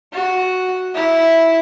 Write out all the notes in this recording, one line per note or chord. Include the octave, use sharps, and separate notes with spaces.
F#4
E4